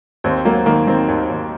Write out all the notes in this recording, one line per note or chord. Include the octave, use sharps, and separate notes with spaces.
D#2 C4
F#3 A#3
D#3 A#3
D#3 C4
D#2
D#2